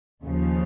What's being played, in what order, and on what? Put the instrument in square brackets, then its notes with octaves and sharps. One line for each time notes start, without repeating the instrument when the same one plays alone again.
[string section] D#2 C#3 F3